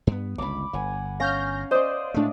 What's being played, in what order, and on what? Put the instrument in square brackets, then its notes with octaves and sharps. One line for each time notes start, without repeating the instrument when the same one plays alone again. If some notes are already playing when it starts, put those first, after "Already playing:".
[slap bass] G2 B3
[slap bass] G1 C#2 [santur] B5 D6
[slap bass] G1 [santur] F#5 G#5
[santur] C#4 F5 [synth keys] F6 G6 A#6
[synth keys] C5 [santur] D5 D#5
[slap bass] A2 G#3 [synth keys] A3 D4